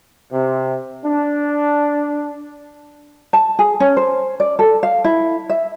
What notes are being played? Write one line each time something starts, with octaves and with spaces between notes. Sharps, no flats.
C3
D4
A5
G#4
C#4
C5
D5
A4
F5
E4
E5